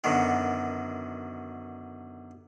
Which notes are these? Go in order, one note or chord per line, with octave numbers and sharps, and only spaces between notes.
F#2 B2 D3 D#3